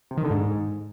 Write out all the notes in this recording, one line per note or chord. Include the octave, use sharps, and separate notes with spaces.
C3
D#3
D3
G#2